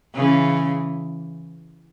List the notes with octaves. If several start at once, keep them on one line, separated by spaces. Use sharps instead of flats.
C#3 E3